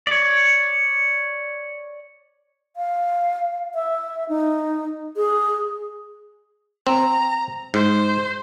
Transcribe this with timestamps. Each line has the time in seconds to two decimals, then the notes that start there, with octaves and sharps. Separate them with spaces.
0.07 C#5 D5
2.77 F5
3.74 E5
4.29 D#4
5.16 G#4
6.87 C4 A#5
7.74 G#2 C5